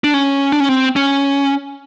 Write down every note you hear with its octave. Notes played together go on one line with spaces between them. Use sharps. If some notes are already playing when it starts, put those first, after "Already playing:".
D4
C#4
D4
C#4
C4
C#4